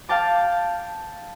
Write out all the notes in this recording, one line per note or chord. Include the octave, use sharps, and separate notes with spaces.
F5 G5 A5 D6